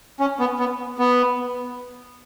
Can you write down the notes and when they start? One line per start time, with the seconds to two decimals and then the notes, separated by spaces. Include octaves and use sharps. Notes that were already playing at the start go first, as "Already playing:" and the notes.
0.20 C#4
0.39 B3
0.59 B3
0.99 B3